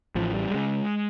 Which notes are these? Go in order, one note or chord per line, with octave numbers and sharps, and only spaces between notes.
A1 A2 F3
G3
C#3 G#3